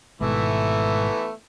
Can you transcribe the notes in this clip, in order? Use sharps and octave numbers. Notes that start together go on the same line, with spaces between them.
G#1 G#2 B2 E3 A3 B3